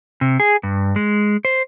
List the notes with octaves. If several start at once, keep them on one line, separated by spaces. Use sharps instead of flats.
C3
G#4
G2
G#3
C5